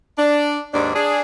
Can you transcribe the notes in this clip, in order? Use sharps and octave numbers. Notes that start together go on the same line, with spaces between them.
D4
D#2 G#2 D4
D4 G#4